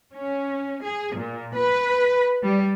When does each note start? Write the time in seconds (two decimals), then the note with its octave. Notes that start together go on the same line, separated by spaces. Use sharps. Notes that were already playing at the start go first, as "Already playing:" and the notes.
0.12 C#4
0.83 G#4
1.15 A#2
1.55 B4
2.43 G3